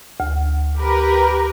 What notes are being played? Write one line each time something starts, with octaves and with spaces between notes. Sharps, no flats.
D2
G4 A#4 B4